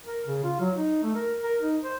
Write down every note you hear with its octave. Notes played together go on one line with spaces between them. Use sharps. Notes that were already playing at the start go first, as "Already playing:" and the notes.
A#4
C#3
F4
F#3
D#4
A3
A#4
A#4
D#4
C5